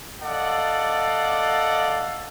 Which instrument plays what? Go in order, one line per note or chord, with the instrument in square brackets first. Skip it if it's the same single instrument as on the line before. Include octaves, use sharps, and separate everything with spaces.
[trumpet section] A4 D5 D#5 F5 F#5